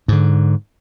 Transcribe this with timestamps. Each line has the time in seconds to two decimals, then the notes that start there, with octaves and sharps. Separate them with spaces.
0.08 G#2 D3